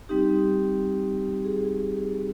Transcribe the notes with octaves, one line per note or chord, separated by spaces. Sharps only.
G3 C4 D#4 G4
G#4